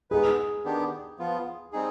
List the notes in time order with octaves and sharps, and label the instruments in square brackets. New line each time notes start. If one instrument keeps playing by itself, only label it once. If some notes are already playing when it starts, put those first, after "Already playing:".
[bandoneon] G#3 B3 D#4 B4 [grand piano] G#4
[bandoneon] D#3 B3 D4 G4
F3 B3 F4
G3 C4 D#4 G#4